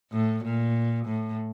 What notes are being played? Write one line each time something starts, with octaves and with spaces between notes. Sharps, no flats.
A2
A#2
A2